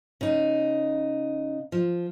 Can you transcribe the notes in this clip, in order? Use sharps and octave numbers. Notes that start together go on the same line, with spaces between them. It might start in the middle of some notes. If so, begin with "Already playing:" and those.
C#3 D#4
F3